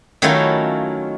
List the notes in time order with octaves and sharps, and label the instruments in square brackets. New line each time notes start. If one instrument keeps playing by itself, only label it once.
[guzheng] D#3 F#3 A3 C#4 E4 F4